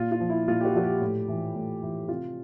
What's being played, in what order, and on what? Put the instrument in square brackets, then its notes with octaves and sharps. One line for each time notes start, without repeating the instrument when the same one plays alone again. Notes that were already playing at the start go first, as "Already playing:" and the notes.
Already playing: [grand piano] A#2 F4
F4
F3
E4
A#2 F4
G4
F#4
F3 F#4
G4
A2
E3
A2
E3
C3 F4